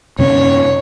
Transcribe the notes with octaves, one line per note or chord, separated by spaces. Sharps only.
F#2 C3 C#4 C#5